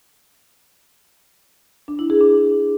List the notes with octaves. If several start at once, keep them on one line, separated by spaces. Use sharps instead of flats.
D4
E4
G#4
D4